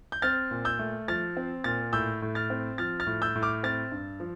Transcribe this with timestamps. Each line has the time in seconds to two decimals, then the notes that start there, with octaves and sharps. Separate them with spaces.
0.12 G6
0.22 C4 F6 A6
0.51 A#2
0.65 E6 G6
0.79 A3
1.08 F3 F6 A6
1.37 C4
1.64 A#2 F6 A6
1.93 A2 E6 G6
2.22 A2
2.35 F6 A6
2.50 C4
2.78 F3 F6 A6
3.00 F6 A6
3.07 A2
3.22 E6 G6
3.35 A2
3.42 D6 F6
3.64 C4 F6 A6
3.92 G2
4.20 F3